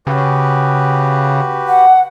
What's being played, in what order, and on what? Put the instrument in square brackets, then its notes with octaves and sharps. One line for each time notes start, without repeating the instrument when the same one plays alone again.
[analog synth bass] C#3 [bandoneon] F#4 G4 B4
[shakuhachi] F#5